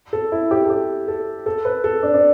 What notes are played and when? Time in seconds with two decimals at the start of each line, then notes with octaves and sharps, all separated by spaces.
0.13 A4
0.32 E4
0.51 G4
0.65 A4
0.70 G4
1.08 A4
1.46 A4
1.65 B4
1.84 A4
2.03 D4
2.14 D4